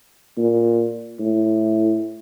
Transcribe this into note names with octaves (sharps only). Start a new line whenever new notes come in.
A#2
A2